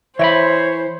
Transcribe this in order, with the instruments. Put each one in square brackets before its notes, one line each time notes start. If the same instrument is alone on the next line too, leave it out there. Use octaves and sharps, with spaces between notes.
[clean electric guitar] E3 G5 B5 [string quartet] C5 [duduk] C#5 [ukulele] E5